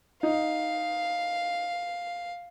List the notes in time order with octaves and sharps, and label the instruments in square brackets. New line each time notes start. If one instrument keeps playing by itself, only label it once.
[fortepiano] D#4 [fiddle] F5